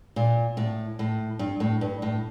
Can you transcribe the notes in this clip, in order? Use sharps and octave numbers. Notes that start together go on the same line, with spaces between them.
A#2
A2
A2
G2
A2
G2
A2